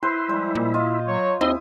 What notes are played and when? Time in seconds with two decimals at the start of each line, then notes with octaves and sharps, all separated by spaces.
0.03 E4 B4 C5 C6
0.29 F3 G3 G#3 C5
0.55 A#2
0.74 F4 D#5
1.07 F#3 C#5
1.41 D#2 C4 D#4 E4 D#5 C6 D#6